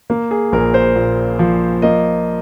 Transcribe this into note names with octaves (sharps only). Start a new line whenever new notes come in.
A#3
G#4
A#1 A#4
C5
A#2
F3
A#3 D#5